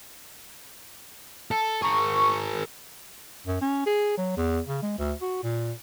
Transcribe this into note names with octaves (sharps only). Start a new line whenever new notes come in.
A4
G#4 A#4 C#6
F#2
C#4
G#4
F#3
E2
C#3
G#3
D2
F#4
A#2